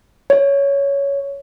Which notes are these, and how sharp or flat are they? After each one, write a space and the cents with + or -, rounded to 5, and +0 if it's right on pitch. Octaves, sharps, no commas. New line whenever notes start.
C#5 +10